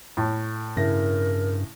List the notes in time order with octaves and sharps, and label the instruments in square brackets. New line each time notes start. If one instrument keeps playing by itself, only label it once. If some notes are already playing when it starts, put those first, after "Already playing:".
[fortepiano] A2
[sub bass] G2 [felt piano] C#3 E4 A#6 [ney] A#4